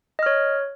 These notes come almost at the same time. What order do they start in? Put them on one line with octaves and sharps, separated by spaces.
D#5 F6 C#5